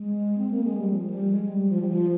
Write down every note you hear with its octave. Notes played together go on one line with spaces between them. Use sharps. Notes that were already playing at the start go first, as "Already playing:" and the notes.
Already playing: G#3
C4
A#3
G#3
G3
F3
G3
G#3
G3
F3
G3
F3